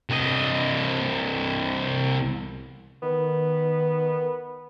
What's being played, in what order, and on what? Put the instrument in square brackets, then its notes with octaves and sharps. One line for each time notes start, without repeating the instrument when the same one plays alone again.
[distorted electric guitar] C2 D#5
[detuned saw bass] D#3 [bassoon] B3